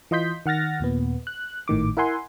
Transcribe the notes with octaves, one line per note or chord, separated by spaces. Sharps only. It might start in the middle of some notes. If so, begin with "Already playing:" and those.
E3 F4 D#5 C6 G6 B6
D#3 F#5 F6 A6 A#6
D#2 A#2 B3
F#6
G#1 A2 D#3 D6
E4 A#4 E5 F#5 G#5 C6